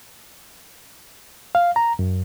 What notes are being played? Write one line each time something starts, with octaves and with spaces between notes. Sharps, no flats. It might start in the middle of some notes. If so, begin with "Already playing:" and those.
F5
A#5
F#2